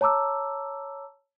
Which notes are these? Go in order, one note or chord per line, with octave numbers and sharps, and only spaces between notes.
C#5 A5 A#5 D6 E6